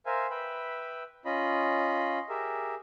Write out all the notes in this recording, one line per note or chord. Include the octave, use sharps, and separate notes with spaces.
A#4 C5 E5 F5 G#5
B4 E5 G5 B5
C#4 F4 D#5 B5
G4 G#4 A#4 E5